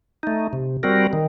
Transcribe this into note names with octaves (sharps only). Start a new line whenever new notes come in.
A3 D#4
C3
G3 C4 F#4 A#4
D#3